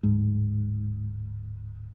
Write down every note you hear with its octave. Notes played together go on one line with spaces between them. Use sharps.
D1 G#2